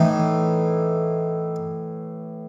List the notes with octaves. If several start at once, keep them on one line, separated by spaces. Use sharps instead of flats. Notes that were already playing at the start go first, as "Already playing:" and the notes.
Already playing: A2 E3 D#4